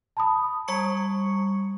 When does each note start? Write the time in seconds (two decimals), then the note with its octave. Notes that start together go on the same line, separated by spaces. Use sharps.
0.17 A5 B5 D#6
0.68 G3 C#6 C#7